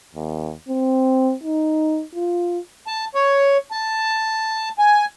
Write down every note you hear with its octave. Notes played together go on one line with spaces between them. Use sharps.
D#2
C4
D#4
F4
A5
C#5
A5
G#5